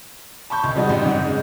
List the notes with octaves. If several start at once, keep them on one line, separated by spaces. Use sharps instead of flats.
A5 B5 C#6 G6
C#2
F3 G3 G#3 D#4 F#4
A1 F#2 G3
G#2 C#3 F#5 G6
C#3 G#3